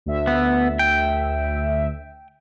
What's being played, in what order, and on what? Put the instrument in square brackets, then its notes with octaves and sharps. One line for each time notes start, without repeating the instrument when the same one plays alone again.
[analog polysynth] D2 E5
[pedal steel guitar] B3
G5